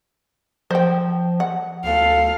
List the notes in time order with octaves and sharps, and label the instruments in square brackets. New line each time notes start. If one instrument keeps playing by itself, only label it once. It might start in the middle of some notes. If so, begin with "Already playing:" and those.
[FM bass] F3 [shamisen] C5 G5
[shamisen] F#5
[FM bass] D2 [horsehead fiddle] A4 F5